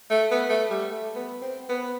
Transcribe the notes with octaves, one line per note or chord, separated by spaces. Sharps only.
A3
B3
A3
G3
A3
B3
C4
B3